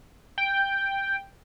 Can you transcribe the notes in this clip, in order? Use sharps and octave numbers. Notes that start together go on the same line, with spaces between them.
G5